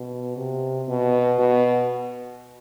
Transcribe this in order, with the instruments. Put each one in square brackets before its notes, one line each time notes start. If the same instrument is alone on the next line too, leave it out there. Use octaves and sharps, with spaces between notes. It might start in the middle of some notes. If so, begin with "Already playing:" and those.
Already playing: [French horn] B2
C3
B2
B2